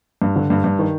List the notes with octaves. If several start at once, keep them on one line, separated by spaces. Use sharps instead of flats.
G2
D3
G2
G2
D#3